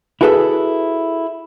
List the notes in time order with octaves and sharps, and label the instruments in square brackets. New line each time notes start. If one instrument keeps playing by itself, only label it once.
[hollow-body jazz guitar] E4 F#4 G#4 A4 B4 E5